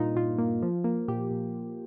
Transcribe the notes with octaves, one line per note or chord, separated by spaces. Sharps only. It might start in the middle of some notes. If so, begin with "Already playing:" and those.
Already playing: G2 A#2 A#3 D#4 F4
A#2 F4
A#3
F3
A#3
A#2 G4
A#2